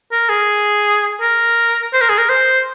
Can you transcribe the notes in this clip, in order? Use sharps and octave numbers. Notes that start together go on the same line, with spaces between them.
A#4
G#4
A#4
C5
A#4
G#4
A#4
C5